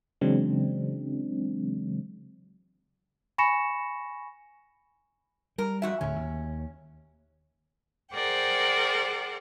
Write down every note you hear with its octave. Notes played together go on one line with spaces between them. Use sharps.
C#3 E3 F#3 G#3 C4 D4
G#5 B5 C#6 A#6 C#7 E7
G3 A#4
F2 F#4 E5
D1 D2 D3 C#4
D#2
G#4 A#4 C5 D5 F#5 G5